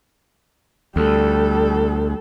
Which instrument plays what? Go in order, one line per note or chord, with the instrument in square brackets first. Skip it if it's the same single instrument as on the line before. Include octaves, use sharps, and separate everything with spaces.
[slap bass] D2 [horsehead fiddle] G3 A4